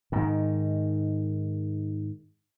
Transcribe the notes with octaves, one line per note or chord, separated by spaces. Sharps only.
G#2 D#3